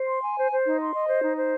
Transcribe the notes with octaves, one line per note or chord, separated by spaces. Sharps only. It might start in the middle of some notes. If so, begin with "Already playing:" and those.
Already playing: C5
C6
G#5
C5
C5
D#4
C6
D#5
C5
D#4
C5